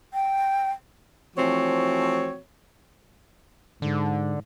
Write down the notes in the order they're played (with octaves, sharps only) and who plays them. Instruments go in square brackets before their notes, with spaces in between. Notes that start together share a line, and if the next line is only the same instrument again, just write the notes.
[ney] G5
[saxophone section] E3 F3 A3 C4 F#4 C#5
[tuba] G#2 [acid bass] D3